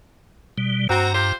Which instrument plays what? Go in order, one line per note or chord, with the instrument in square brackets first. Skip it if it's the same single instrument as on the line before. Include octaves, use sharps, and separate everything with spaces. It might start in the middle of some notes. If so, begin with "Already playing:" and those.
[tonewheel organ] B2 G3
[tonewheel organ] G2 A#5 [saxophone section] C4 F#4
[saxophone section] F4 G4 C5